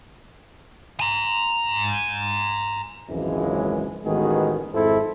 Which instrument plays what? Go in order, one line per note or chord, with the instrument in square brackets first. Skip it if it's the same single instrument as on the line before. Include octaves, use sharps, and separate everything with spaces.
[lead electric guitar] G#5 A#5
[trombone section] G#1 C#2 F#2 E3 F3 G#3
A1 D#3 G#3 B3 F#4 G#4
G#1 F2 G#2 E4 A4 C5